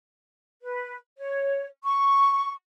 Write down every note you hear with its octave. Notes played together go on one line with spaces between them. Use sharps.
B4
C#5
C#6